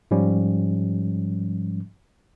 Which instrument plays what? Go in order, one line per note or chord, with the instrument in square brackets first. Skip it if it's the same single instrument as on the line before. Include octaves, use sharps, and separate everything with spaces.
[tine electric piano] G#2 F3 G3 C#4